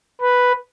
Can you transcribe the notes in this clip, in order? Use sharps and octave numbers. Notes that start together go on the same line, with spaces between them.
B4